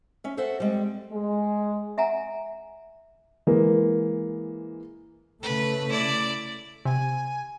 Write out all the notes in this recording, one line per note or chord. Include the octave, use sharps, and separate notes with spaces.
C#4 E5
A4 C5 E5 F#5
G3 G#3 C4
G#3
E5 F#5 G#5 A#5
E3 G#3 A#3
C#3 A3 B4
E4 D5
C3 G#5